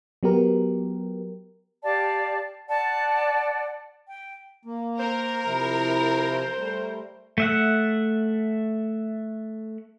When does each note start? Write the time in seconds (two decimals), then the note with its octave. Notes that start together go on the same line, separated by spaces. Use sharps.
0.23 F#3 B3 G4 A#4
1.84 G4 D5 F5 A5
2.69 D5 F#5 A5
4.08 G5
4.65 A#3
5.00 A#4 C5
5.46 C3 F3 E4
6.58 G3 A3
7.38 A3 E5 F#5